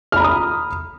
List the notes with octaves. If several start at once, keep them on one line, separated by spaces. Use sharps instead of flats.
A#5 B5 D#6 F6